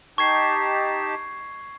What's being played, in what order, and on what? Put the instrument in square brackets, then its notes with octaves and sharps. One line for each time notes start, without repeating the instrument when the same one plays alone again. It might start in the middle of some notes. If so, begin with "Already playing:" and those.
[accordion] D#4 G4 A5 [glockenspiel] C#6 G#6 C7